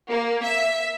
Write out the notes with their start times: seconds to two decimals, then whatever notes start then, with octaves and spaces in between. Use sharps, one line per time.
0.11 A#3
0.43 E5